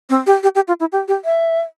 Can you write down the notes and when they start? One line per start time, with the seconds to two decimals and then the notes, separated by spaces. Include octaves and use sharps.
0.10 C4
0.27 G4
0.43 G4
0.55 G4
0.68 F4
0.80 E4
0.92 G4
1.08 G4
1.25 E5